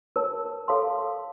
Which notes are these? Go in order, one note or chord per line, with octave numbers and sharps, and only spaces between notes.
A#4 C#5 A5
A4 C#5 F5 A5 C6